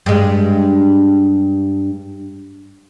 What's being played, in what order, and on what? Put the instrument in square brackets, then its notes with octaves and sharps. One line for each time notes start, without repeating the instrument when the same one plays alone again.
[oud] G2 G#3